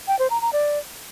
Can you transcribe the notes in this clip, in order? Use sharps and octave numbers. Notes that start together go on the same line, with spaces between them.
G5
C5
A#5
A#5
D5